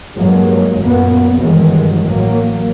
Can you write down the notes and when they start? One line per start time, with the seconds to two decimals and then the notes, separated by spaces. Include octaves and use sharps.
0.16 G2 F#3 G#3 A#3
0.80 F#2 A#2 A#3 B3
1.40 G2 B2 D#3 E3 F#3 G#3
2.05 A1 F#3 A#3